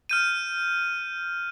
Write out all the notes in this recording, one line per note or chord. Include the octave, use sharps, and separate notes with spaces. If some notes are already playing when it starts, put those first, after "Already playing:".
F6 G6 D#7